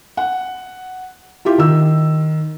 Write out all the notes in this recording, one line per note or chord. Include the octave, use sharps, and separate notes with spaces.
F#5
E4 F4 G4
D#3 E6